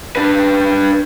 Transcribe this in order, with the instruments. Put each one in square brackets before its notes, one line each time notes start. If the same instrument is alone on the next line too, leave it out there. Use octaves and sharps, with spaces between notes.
[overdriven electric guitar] D4 B4